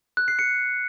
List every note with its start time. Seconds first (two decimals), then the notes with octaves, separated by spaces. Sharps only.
0.17 F#6
0.28 C7
0.39 C#7